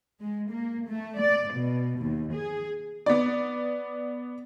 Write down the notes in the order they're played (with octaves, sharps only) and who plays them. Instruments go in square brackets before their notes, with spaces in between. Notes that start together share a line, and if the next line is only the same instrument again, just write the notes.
[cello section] G#3
A#3
A3
D5
B2
D#2
G#4
[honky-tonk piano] B3 D5